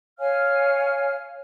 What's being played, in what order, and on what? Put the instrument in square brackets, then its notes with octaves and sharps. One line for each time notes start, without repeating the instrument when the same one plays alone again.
[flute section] C#5 F5 G#5 F6